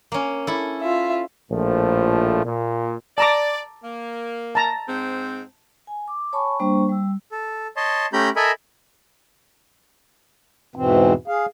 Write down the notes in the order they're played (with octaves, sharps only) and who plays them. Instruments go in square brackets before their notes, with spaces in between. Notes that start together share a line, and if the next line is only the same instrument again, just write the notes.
[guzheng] A#3 C#4
E4 A4
[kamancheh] F4 E5
[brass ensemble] A#1 A2 F3 A3
A#2
[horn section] D5 [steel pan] A5 A#5 D6
[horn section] A#3
[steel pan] A5 A#5
[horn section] G#2 C4
[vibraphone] G#5
D6
C#5 G#5 A5 B5 C#6
G3 A#3 D4 C5 C#6
G3 E6
[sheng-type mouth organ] A4
C#5 D#5 A5 C6
A3 C#4 G4 A#5 B5 G6
A4 A#4 D#5 E5 G#5 B5
[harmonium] E2 G#2 B2 E3 C4
G#4 F5